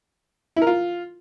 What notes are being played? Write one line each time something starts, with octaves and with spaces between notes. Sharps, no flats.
E4
A#4
F4